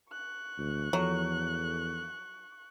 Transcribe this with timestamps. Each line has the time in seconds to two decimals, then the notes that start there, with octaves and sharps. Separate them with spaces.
0.11 C#6 F#6
0.58 D2
0.93 E2 F3 F#3 A4